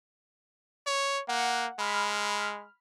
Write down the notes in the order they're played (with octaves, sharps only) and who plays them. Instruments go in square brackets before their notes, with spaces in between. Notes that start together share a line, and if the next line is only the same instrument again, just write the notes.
[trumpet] C#5
[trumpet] A#3 [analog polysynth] F#5
[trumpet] G#3 [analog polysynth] B5 F6